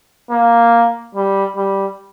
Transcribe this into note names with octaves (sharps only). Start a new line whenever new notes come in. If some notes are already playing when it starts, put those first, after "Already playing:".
A#3
G3
G3